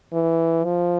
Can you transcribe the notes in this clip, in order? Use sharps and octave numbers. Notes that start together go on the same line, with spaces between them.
E3
F3